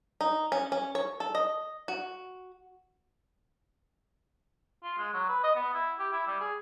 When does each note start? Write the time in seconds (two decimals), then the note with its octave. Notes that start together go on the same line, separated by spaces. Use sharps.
0.21 D#4
0.52 C#4
0.72 C#4
0.95 C#5
1.20 A4
1.35 D#5
1.88 F#4
4.83 F4
4.98 G#3
5.14 F#3
5.29 B4
5.44 D#5
5.56 B3
5.74 E4
5.99 G4
6.13 E4
6.27 G3
6.41 G#4